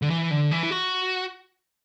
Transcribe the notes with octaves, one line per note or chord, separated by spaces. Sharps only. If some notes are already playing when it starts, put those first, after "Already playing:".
D3
E3
D3
E3
E4
F#4